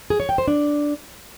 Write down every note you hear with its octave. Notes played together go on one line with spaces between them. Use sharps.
G#4
C#5
G5
C5
D4